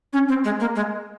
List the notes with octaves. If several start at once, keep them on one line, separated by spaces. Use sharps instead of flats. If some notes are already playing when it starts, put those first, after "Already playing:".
C#4
C4
G#3
A#3
G#3